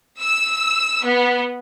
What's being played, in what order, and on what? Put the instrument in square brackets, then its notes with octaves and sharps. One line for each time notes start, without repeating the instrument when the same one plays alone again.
[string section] E6
B3